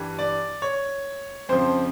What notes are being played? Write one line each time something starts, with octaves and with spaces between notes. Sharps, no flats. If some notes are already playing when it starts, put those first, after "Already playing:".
Already playing: G2 E3 G3
D5
C#5
F2 C#3 F3 C5